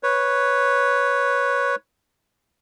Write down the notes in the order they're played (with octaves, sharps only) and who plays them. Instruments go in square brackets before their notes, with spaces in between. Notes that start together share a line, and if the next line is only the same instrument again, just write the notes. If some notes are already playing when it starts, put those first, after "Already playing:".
[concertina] B4 C#5